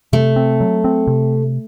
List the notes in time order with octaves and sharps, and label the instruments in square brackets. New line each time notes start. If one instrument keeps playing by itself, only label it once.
[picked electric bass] C3 [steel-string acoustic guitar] A3
[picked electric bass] C4
F#3
C4
C3